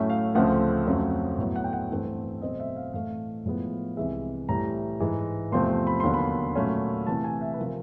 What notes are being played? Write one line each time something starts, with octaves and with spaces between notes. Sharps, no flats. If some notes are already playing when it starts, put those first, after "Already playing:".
Already playing: A2 F#3 A3 C#4 E5
F5
D2 C#3 F3 A3 C4 F#5
F2 C#3 F#3 A3 C4
A2 F#3 B3
F#5
G5
F#5
G2 E3 A3 C4
B2 F#3 A3 C4 D#5
E5
F5
A2 E3 A3 F5
A2 F3 G#3 B3
C2 C3 E3 G#3 E5
A2 E3 G3 A#5
G#2 E3 G#3
E2 C3 F3 A3 C4 C6
B5
D#2 D3 F#3 B3 C6
B5
A#2 F#3 A3 C#4
C3 E3 A3 A5
G#5
E5
B4
C3 F3 A#4